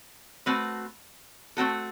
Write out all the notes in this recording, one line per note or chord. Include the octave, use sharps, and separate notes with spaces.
A3 C4 F#4 B4
A3 C4 F#4 A4